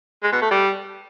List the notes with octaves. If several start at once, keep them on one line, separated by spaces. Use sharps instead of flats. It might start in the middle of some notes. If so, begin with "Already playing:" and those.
G#3
B2
A3
G3